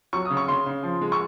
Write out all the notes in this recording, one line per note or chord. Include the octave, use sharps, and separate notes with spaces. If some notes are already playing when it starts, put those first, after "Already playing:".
F#3 C#6
D#6
C#3
C#6
C#3 C6
C#3
F3
G#3
C#6